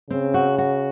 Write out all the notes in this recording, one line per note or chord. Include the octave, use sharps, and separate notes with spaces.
C#3 C4
F#4
F#4